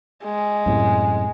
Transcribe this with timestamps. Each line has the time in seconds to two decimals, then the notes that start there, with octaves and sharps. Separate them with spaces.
0.24 G#3
0.66 F#2 A2 C3